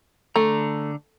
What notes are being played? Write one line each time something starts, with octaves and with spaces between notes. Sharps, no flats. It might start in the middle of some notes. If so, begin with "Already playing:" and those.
D3 A3 A#5